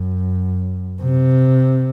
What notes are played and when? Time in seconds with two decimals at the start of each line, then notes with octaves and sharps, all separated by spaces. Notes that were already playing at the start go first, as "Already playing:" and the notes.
Already playing: F#2
1.02 C3